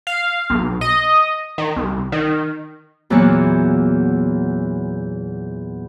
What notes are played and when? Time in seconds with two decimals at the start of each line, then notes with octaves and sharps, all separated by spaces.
0.07 F5
0.50 B1
0.81 D#5
1.58 D#3
1.76 C2
2.12 D#3
3.10 E2 A#2 E3 F#3 A#3 C#5